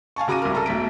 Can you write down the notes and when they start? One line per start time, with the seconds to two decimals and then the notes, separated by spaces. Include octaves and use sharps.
0.16 F5 G#5 A5 C#6
0.28 C#3 F#4 A#5 D6 A#6 D#7
0.42 C2 A#4
0.55 A4 A#4 A#5
0.66 B1 A3 B6 D7